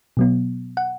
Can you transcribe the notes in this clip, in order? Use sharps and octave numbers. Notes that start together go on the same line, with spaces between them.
B2 F#3 B3
F#5